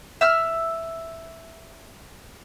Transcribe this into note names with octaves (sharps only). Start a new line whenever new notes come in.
E5 E6 F6